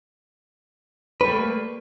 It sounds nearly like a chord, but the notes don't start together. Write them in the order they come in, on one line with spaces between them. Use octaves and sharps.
B4 G3 A3 A#3